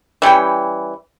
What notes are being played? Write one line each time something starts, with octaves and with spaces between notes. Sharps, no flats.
E3 G3 C#4 G5